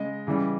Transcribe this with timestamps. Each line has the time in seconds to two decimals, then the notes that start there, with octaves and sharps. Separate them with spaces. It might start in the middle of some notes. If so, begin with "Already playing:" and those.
Already playing: C#3 G#3 D#5
0.27 C#3 E3 G3